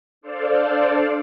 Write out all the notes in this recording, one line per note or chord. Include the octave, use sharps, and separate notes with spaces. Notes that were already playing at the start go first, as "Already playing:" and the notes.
D4 A4 C5 D5 F5